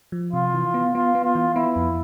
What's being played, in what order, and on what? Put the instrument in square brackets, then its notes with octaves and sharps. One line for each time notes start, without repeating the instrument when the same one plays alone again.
[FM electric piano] F3
[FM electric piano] C3 [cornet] F4
[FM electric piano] E3
B3
[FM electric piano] B3 [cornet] F4
[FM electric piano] B3
[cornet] F4
[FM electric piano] E3
[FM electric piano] B3 [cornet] E4
[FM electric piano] F2